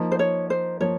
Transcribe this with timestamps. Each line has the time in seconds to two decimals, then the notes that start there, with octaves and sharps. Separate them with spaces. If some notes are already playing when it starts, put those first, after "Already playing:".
Already playing: F3 A#3 D#4
0.12 C5
0.19 C#5
0.50 C5
0.81 F3 A#3 C#5